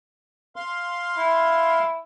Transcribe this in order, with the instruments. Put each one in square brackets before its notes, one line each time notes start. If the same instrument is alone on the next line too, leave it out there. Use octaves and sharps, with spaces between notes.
[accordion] F5 C6
[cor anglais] E4